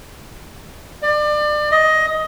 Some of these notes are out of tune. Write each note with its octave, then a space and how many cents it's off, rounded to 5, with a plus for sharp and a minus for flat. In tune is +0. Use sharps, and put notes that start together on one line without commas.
D5 +30
D#5 +15